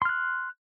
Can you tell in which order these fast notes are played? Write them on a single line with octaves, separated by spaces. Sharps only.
C6 F6 F#6